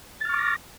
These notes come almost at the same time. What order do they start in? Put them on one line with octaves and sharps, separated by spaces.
A6 F6 C#6 D6 A#6